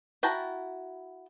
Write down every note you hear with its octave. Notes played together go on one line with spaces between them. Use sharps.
E4 F#4 G5 A5 A#5